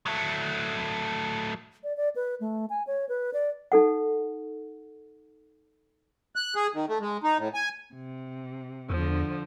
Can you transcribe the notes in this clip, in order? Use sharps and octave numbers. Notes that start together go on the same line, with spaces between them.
F#3 A3
D5
D5
B4
A3
G#5
C#5
B4
D5
D#4 A4 F#5
F#6
G#4
D#3
A3
G#3
D#4
A2
G#5
C3
E2 D3 F3